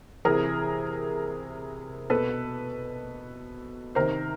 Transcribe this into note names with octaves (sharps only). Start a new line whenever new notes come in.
C3 E3 G#4 A#4
B2 A4 B4
C3 D#3 A#4 C5